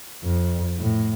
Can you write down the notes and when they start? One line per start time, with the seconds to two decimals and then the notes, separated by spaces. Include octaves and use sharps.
0.25 F2
0.79 A2